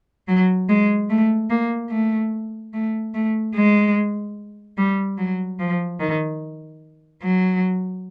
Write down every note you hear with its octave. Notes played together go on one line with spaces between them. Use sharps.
F#3
G#3
A3
A#3
A3
A3
A3
G#3
G3
F#3
F3
D#3
F#3